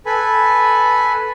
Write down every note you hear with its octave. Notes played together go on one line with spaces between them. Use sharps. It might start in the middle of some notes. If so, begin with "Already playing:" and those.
A4 B4 G#5 B5